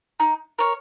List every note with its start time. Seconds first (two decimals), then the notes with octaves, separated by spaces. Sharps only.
0.20 D#4
0.59 A#4 C#5